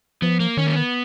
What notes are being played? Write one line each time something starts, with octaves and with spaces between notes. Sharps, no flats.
F3 B3
A#3
D#3 C#4
A#3
B3